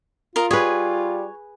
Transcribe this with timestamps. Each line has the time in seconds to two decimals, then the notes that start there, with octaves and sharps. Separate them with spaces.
0.36 F4 A#4 D#5 F5
0.51 G3 G#4 B4 C#5